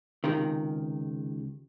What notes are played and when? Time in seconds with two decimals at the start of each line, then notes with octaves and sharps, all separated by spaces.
0.24 C#2 C3 D#3